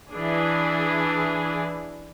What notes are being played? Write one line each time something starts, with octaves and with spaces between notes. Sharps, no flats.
E3 D4 G#4